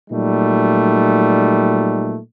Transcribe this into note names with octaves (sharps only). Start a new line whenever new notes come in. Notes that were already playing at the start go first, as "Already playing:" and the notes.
A#2 F#3 G3 A3 D#4